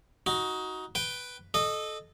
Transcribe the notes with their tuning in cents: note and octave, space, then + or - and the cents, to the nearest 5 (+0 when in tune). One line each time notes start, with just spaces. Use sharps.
D#4 +20 F#4 +0
B4 +0 G5 +0
A4 -20 D#5 -20